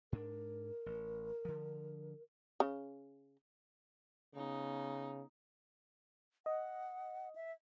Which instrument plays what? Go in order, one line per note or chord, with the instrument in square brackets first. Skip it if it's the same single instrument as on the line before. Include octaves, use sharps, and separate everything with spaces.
[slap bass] G#2 D4 [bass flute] A#4
[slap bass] A1
D3 F3
[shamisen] C#3
[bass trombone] C#3 [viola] B3 D#4
[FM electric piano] D#5 [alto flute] F#5
[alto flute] E5